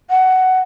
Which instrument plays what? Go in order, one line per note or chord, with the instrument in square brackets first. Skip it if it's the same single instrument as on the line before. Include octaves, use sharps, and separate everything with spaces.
[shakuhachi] F#5